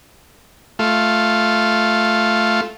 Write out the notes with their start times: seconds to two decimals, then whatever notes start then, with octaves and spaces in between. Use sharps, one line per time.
0.79 A3 F4